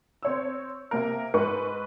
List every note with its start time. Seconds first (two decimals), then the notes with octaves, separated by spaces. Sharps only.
0.23 C4 C#5 E6
0.91 C3 A#3 A#4
1.34 G#2 B4 C#6